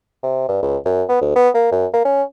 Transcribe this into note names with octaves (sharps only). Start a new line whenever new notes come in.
C3
G2
C#2
F#2
B3
D2
B3
A#3
F#2
A#3
C#4